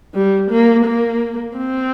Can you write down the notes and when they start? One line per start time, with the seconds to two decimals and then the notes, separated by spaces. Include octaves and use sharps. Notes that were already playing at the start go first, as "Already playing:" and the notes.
0.14 G3
0.51 A#3
0.86 A#3
1.58 C4